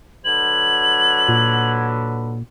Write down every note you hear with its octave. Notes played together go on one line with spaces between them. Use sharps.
D3 F#3 B4 G#6 F#7
A#2